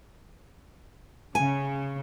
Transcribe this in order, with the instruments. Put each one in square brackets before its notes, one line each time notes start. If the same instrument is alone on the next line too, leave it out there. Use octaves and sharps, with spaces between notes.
[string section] C#3 [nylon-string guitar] G#5